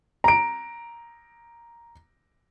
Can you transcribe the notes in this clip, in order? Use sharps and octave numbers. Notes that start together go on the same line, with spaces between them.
A#5 D7